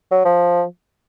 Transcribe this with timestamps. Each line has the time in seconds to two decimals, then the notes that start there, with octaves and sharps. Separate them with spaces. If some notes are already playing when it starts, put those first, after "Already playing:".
0.11 F#3
0.25 F3